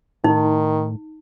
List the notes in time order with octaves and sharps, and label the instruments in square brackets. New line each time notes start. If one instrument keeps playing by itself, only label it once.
[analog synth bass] A2 [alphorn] D#3 [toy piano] D#4